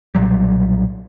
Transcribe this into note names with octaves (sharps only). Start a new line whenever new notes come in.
B1 A#2 F#3 G3